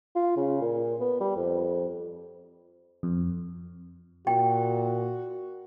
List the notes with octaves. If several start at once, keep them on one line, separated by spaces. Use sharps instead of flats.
F4
C#3
A#2
B3
G3
F2
F2
A#2 F#4 G5